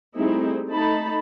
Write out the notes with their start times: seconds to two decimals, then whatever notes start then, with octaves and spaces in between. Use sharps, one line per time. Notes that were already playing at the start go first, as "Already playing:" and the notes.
0.16 G3 A3 C4 D#4 E4 G#4
0.69 A3 D#4 A5 B5